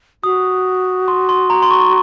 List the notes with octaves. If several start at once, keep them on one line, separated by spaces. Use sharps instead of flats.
F#4 D#6
C6
C6
A#5
C6
C#6